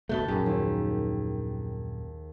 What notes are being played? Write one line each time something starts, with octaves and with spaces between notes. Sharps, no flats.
D2 B2 A3 A5 F#6 G6
A#1 F#2 G4 G#4
D#2